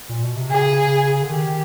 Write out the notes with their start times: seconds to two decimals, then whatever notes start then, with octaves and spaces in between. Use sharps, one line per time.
0.09 A#2
0.23 B2
0.36 C3
0.50 C#3 G#4
1.22 D3
1.29 D#3 G4